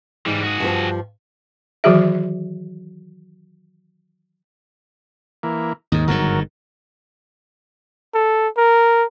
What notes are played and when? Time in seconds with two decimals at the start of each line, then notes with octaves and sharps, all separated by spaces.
0.26 G#2 E3 G3
0.43 F#4 G#4
0.60 G2 F3
1.84 D#3 E3 F#3 F#4 G#4 E5
5.43 E3 A#3
5.92 D#2 G#2 D#3
6.08 G1 G#2 D#3 F#3 A#4
8.14 A4
8.57 A#4